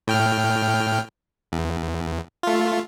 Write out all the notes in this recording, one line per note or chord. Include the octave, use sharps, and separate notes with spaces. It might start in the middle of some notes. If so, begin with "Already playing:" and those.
A2 G5 F6
E2
A3 F4